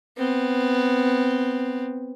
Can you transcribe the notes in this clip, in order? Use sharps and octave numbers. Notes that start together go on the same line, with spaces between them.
B3 C4